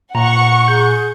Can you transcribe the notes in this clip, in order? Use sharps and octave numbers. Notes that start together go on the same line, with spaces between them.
A#2 F#5 A#5 C#6
G#4 G6